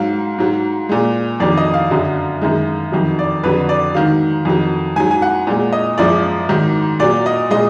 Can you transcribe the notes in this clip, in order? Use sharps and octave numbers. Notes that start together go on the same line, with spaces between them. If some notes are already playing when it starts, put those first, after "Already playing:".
Already playing: G#2 F#3 F5
G#2 F#3
A#2 G#3
F2 D#3 F#3 D5
D#5
F5
F#2 D3 F#3
F#2 D#3 G#3
F2 D#3 F#3
D5
F2 D3 F#3 B4
D5
G#2 D#3 F#3 F5
F2 D#3 F#3
G#2 F#3 G#5
G#5
F#5
A#2 G#3
D#5
F#2 F3 G#3 D5
G#2 D#3 F#3
A#2 F#3 D5
D#5
A#2 G#3 D#5